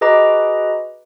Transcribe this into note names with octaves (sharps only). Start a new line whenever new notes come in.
F#4 G#4 B4 D#5 A#5 D6